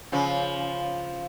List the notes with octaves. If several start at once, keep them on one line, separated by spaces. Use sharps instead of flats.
C#3 F3